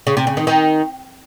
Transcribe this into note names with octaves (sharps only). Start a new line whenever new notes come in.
C#3
C3
C#3
D#3
D#3